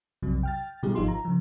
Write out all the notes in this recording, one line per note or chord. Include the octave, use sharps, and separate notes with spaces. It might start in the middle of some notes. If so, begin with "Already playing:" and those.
B1 F2 C3 F#3
G5 F6 A6
B2 D3 G3 E4 G4 G#4
G#1 F3 D#4 F4 C6
A#5
C#3 F3